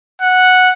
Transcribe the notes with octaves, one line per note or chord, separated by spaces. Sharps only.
F#5